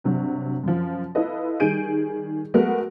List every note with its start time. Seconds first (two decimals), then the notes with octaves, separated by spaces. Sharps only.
0.04 G2 C3 F#3
0.64 F#2 F3
1.15 E4 F4 A4 B4 D#5
1.60 D#3 G3 G#4 G6 D7 D#7
2.54 F#3 G#3 A3 B3 F#4 A#4